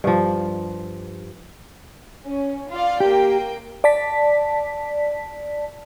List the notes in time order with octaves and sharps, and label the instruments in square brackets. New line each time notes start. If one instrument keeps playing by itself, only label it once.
[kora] G2 F3
[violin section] C#4
F4 D5 F5
[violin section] A#3 G5 [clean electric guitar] G4
[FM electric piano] D5 A5 B6